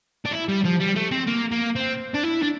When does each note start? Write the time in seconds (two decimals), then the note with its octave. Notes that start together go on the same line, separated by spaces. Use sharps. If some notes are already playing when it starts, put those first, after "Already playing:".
0.25 D4
0.32 E4
0.48 G3
0.64 F3
0.80 G3
0.96 A3
1.11 C4
1.27 A#3
1.52 A#3
1.75 C4
2.14 D4
2.23 E4
2.42 D4